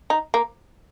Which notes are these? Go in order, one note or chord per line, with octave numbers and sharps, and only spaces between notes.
D#4
A#3